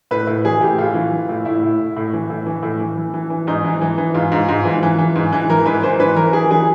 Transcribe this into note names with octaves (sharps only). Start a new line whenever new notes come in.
A2 B4
A2
E3 G#4
A2 G4
A2 F4
E3
E3
A2
A2 E4
A2
A2
A2
E3
A2
E3
A2
E3
E3
E3
E3
G#2 D#4
E3
E3
E3
G#2 F4
G#2
G#2
E3
E3
E3
G#2
E3
E3 A#4
G#2 B4
E3 C5
E3 B4
E3 A#4
E3 G#4
E3 G#4